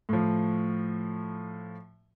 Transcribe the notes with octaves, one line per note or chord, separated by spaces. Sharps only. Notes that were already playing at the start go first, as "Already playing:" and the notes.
A2 F3